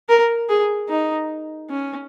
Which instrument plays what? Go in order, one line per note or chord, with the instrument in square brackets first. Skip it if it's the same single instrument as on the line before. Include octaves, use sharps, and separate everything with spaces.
[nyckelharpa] A#4
G#4
D#4
C#4